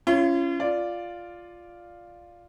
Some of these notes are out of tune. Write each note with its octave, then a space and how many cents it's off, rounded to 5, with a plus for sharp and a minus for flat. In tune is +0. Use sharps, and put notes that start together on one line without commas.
C#4 +0 F4 -40
F4 +0 D5 +0